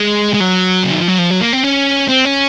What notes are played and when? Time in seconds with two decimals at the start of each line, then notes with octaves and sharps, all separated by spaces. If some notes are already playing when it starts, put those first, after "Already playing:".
Already playing: G#3
0.34 G#3
0.40 F#3
0.84 C#3
0.91 D#3
0.99 F3
1.08 F#3
1.18 F3
1.31 F#3
1.41 A#3
1.53 C4
1.63 C#4
2.08 C4
2.25 C#4